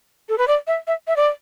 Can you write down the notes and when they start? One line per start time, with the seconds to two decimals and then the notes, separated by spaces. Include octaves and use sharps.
0.29 A4
0.38 B4
0.48 D5
0.67 E5
0.87 E5
1.07 E5
1.16 D5